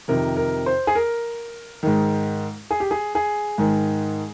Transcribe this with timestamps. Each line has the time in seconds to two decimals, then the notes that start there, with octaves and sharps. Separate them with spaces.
0.08 F2 C3 D#3 A#4
0.37 A#4
0.66 C5
0.87 G#4
0.95 A#4
1.83 G#2 D#3
2.71 G#4
2.80 G4
2.91 G#4
3.15 G#4
3.58 G#2 D#3